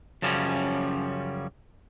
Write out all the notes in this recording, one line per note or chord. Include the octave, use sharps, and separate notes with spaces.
F#2 C#3 F3 G3 C#4